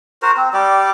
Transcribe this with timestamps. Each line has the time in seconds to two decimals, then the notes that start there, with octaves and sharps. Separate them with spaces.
0.22 F#4 A#4 C5
0.37 C4
0.53 G3 G4 D5